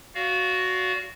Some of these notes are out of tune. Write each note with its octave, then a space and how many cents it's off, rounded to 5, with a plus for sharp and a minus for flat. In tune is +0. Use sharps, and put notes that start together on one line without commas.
F#4 +0 D5 -35 F5 +0